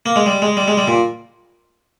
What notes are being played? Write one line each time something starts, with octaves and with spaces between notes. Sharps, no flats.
A#3
G#3
G3
G#3
G3
G#3
G3
A#2